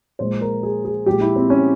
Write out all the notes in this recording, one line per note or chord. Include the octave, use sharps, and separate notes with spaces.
A#2 F3 G#3 C5
A#4
G#4
G#4
A#2 F3 G#3 G4
E4
C4
C#4